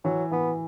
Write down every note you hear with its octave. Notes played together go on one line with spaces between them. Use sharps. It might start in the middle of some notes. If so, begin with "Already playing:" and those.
E3 F#3
E3 B3